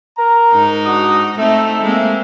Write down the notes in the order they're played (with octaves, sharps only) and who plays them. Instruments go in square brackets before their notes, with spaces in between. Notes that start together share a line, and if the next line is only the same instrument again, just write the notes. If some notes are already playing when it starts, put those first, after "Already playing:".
[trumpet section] A#4 A#5
[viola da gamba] G#2 D#4
[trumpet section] D4 F#4 D#6
[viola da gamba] A3 C4 D#4 [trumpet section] A4 E5
[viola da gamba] G#3 A#3 C4